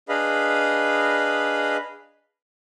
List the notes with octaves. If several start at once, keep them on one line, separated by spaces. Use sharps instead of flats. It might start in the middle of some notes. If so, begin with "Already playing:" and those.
D4 G#4 B4 D#5 F5 B5